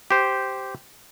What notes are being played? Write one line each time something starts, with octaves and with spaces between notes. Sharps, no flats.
G4 C5